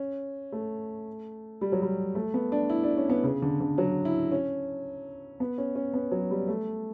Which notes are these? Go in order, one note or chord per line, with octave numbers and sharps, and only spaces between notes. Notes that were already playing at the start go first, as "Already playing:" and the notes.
Already playing: C#4
A3
G3
F#3
G3
A3
B3
D4
E4
D4
C#4
B3
C#3
D3
D3
F#3
E4
C#4
B3
C#4
C#4
B3
F#3
G3
A3